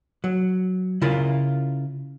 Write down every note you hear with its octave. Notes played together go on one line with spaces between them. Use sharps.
F#3
C#3 E4 F4 A#4